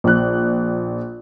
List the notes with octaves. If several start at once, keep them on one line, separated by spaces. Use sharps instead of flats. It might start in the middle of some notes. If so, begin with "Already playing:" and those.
A#1 F#6